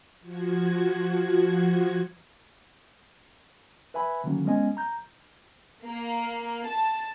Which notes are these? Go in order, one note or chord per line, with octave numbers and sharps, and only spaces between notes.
F3 F#4 G#6
B4 E5 G#5 B5
D3 D#3 F#3 A#3 C#4
G#3 B3 C#4 D#5 G#5
A#5 G6
A#3
A5